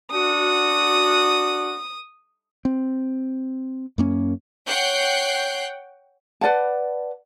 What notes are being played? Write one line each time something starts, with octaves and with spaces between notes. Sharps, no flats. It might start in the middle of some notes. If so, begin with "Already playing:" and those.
D4 F#4 D#6
C4
F#2 A#3 C#4
C#5 F#5 G5 F#6 G6 C7
B4 D5 F#5 A5